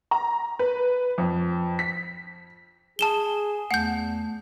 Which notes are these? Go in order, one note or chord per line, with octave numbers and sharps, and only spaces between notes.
A#5
B4
F2
B6
G#4 A5 E7 G7
E2 A3 F#5 G6